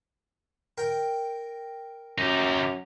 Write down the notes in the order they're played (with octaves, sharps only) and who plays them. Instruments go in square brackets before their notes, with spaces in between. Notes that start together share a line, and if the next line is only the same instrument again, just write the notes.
[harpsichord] A#4 G5
[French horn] F#2 [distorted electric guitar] D#4 G4